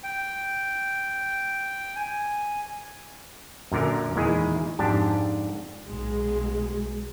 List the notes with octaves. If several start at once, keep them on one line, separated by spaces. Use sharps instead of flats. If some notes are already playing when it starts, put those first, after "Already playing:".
G5
G#5
F#2 A#2 D3 A#4
E2 A#2 D#3 G#3 E4 G#4
F2 G#2 D4 G4 A5
B1 G#3